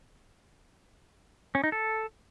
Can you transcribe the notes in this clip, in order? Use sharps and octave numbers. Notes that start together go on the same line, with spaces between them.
C#4
D#4
A4